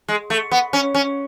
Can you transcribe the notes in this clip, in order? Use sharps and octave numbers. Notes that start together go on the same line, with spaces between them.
G#3
A3
B3
C#4
C#4